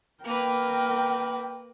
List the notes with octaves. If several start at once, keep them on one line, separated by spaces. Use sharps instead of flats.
A#3 A#4 B4 G5